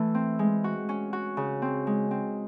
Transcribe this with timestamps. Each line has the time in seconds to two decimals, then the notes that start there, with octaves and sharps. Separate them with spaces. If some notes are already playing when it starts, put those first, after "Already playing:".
Already playing: E3 A3
0.15 C4
0.39 G#3
0.64 F#4
0.89 C#4
1.13 F#4
1.37 C#3
1.62 C4
1.87 G#3
2.11 C4